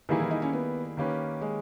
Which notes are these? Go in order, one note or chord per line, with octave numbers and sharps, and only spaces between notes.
D#3 E3 G3 A#3 E4 G#4
E3
D#4
C#4
B3
D#3 A#3 C#4 G4 B4
G#3